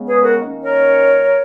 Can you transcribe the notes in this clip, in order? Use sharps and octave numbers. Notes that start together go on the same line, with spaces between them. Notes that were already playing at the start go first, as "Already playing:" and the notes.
Already playing: C#3 G#3 B3
G#4 B4
F#4 A#4
D#3 A#3 C#4
A#4 C#5